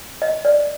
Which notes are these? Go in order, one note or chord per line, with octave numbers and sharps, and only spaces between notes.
D#5
D5